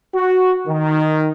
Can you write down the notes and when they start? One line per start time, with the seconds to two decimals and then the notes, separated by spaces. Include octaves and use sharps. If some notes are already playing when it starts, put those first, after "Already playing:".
0.14 F#4
0.68 D#3